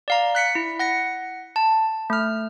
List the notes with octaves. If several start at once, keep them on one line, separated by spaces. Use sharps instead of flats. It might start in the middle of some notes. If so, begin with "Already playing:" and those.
D5 F5 A#5
F#6 B6 C#7
E4
F#5 A#6 C#7
A5
A3 F6